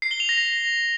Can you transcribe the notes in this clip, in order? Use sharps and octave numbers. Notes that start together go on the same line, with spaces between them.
C7
G7
F7
A#6